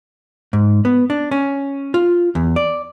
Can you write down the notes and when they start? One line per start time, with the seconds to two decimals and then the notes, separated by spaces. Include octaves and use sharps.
0.53 G#2
0.85 B3
1.10 D4
1.31 C#4
1.94 F4
2.35 E2
2.56 D5